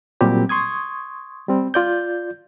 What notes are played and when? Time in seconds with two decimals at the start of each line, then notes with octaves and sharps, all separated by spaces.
0.21 A#2 F#3 G3 C4 G4
0.49 C6 C#6 D#6 G#6
1.48 G3 C4
1.74 F4 D5 G6